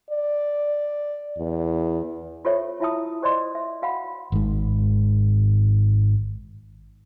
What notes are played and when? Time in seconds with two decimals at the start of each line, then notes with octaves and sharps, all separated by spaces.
0.10 D5
1.37 E2
2.45 F4 G4 A4 C5 C#5 E5
2.80 E4 F4 E5 A5 D#6
3.22 G4 C5 D5 D#5 C6
3.55 E5
3.82 F#4 F5 F#5 B5
4.32 G#1 G#2